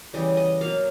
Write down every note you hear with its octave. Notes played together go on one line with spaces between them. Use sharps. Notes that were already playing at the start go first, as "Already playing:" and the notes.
C#3 E3 G3 B3 D#5
D#5
B2 F#3 A#3 F5